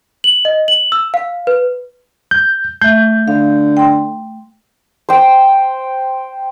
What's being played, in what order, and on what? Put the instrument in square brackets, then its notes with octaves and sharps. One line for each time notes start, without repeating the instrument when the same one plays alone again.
[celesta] F#7
D#5
F#7
E6
F5
B4
[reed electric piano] G6
[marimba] A3 E5 [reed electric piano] G6
[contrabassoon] D3 [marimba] F5
[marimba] G5 C6
[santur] C5 G5